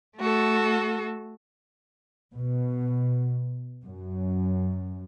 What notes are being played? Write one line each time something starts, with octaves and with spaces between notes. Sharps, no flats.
A3 F#4 A4
B2
F#2